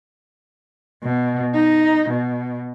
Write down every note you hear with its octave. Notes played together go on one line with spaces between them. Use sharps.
B2
D#4
B2